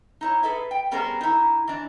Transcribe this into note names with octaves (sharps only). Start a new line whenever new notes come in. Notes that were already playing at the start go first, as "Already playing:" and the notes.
D#4 E4 C#5
G#4 A4 B4 E5
G5
G3 B3 C#4 G#4 A#4 C5
D#4 E4
E3 D4